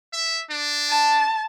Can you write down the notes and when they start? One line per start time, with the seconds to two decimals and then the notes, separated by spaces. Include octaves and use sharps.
0.13 E5
0.50 D4
0.89 A5